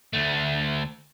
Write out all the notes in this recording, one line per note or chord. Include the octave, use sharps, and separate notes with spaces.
D2 A3